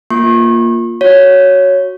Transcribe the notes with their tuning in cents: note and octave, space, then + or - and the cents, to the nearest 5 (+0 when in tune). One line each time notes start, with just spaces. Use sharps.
A#3 +0 F4 +0 C#6 -35
F#4 +0 C#5 +0